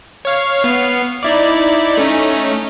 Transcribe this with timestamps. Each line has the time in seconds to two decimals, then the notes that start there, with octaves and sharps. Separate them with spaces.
0.25 C#5 F5
0.64 B3 F6 C7
1.23 D#4 E4 D5
1.97 A3 C#4 D#4